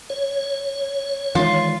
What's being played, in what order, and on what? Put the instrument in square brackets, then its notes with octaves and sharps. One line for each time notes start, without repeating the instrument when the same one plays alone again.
[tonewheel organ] C#5
[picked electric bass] D#3 E3 G#3 [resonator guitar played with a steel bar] F4